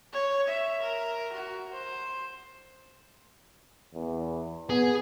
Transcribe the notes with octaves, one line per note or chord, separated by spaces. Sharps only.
C#5
E5
A#4
F#4
C5
E2
B3 G#4